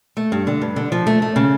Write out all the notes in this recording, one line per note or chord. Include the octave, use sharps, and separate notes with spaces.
A3
G2
D3
G2
D3
F3
A3
A3
C#3